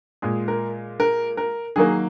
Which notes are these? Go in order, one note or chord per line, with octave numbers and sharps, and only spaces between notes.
A#2 G#3 G#4
A#4
A#4
A#4
D#3 F#3 A#3 G#4